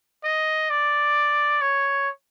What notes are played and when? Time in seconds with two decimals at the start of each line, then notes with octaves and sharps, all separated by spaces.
0.24 D#5
0.70 D5
1.61 C#5